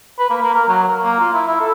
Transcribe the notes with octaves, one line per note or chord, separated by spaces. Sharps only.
B4
A#3
A#3
A#4
F#3
A#4
A#3
F4
E4
E4
A4